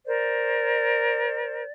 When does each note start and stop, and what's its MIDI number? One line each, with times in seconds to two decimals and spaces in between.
0.06 1.64 70
0.06 1.64 72
0.06 1.72 74